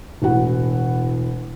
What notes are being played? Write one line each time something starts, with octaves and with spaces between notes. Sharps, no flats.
E1 A2 F#4 F#5